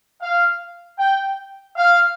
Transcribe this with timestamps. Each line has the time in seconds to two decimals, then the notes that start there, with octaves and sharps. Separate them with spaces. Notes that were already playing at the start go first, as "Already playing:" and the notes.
0.21 F5
0.99 G5
1.76 F5